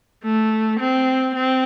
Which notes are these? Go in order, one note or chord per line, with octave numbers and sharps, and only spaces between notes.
A3
C4
C4